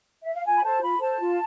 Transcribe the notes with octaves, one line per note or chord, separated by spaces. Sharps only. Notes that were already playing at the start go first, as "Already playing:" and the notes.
E5
F5
F4 G#5
B5
A4 C5 A5
F4 B5
A4 C5 A5
F4